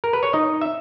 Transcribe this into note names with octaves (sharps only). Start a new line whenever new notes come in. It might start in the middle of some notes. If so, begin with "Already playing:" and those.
A#4
B4
C#5
D#4 D#5
E5